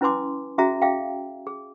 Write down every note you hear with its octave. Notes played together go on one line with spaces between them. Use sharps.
C#4 E4 B4 G#5 C6 D6
C#4 F#4 G#4 E5 A#5
G#4 E5 F5 G5
G#4